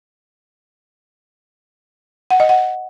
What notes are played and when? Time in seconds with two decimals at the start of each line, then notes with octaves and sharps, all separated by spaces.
2.30 F#5
2.40 D#5
2.49 F#5